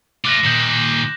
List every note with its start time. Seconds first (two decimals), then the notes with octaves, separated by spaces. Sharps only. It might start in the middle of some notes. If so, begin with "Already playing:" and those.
0.25 A3 F4 D6 F#6 A#6
0.44 A#2 D#3 G6 E7 F#7